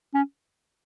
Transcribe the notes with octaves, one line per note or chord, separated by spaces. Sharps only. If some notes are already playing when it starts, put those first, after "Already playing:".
C#4